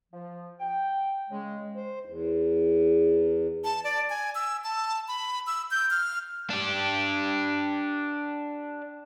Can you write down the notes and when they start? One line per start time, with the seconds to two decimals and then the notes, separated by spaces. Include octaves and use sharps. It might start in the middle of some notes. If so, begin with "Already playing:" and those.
0.12 F3
0.59 G5
1.30 C#3 G#3
1.74 C5
2.05 E2
3.64 A5
3.84 D5
4.10 G#5
4.35 E6
4.64 A5
5.08 B5
5.47 E6
5.71 G6
5.91 F6
6.50 D4 G4